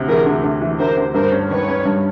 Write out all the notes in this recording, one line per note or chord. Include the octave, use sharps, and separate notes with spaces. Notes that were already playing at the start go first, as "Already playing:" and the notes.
Already playing: D2 C3
E3 G#4 A#4
D2
D2
E3
D2 A#4 C5
D2
G2 A#4 C5
C#4
D#3 B4 C#5
C#4
G2